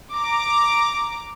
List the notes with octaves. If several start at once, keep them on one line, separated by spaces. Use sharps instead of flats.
A#5 D6